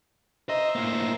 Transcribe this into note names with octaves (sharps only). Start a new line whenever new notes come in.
C5 D#5 E5 A#5
A2 A#3